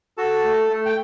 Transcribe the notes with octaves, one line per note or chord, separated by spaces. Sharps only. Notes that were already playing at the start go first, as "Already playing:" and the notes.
F#4 A4 A5
A3
A3
G5